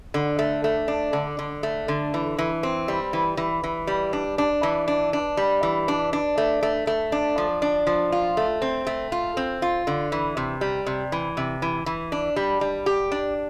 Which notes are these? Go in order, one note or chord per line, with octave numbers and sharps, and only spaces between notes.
D3
A3
A3
D4
D3
D3
A3
D3
E3
E3
C4
G3
E3
E3
E3
G3
D4
D4
E3
D4
D4
G3
E3
D4
D4
A3
A3
A3
D4
F3
D4
F3
F4
A3
C4
A3
F4
C4
F4
D3
E3
C3
G3
C3
E3
C3
E3
E3
D4
G3
G3
G4
D4